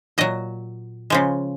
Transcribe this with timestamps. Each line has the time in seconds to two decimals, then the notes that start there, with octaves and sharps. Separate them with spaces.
0.18 A#2 F#3 D#5
1.10 C#3 F3 G#3